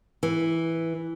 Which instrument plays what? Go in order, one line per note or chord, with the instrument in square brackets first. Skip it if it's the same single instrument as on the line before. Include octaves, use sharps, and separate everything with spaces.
[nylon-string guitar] E3